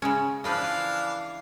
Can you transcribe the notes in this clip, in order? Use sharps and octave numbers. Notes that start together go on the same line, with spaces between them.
C#3 G#3 C#4
E3 F3 D4 B4 D#5 F5